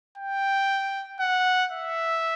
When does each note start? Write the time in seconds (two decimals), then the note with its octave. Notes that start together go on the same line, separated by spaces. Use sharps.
0.18 G5
1.20 F#5
1.71 E5